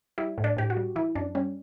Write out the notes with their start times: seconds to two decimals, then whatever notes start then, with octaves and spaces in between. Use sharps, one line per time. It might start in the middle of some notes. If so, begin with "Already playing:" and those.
0.18 G3 E4
0.38 A2
0.44 D4
0.57 A2 G4
0.70 F#4
0.77 G3
0.96 E3 E4
1.15 F#2 D4
1.35 G3 C#4